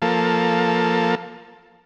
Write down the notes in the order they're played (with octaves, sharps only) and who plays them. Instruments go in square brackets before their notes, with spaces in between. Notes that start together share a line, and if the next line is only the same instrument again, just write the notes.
[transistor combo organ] F3 A#3 A4